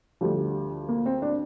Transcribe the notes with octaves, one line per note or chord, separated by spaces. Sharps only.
D2 D3 F3 G3
A#3
C4
D4